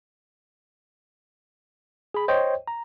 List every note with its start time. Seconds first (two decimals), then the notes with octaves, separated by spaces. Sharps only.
2.14 G#4 B5
2.28 C5 C#5 D#5 G5
2.68 A#5